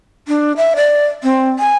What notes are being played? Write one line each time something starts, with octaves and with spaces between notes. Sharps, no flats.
D4
E5
D5
C4
G#5